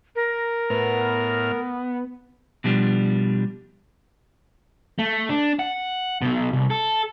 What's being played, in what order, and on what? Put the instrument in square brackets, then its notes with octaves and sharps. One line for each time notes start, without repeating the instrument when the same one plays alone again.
[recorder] A#4
[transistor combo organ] A2 F6 [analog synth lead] B3
[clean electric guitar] B2 F3 G3 D4
[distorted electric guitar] A3
D4
F#5
B1 B2
C2
A4